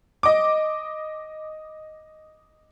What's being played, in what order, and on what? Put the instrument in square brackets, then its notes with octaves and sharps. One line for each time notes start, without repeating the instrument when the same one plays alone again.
[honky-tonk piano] D#5 D6